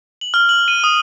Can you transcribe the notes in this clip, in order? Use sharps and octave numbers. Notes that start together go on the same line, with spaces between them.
F#7
F6
F#7
D#7
D#6